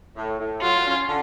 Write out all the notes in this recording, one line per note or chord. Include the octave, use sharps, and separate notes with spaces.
A2
A2
F#3 F4
C#4
D3